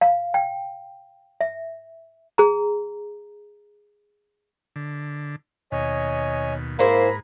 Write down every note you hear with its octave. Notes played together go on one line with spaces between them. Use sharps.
F5
G5
E5
G#4 A#5
D3
D#2 B2 C#5 D#5 G#5
G#2 A#3 E4 G#4 C5 A#5 B5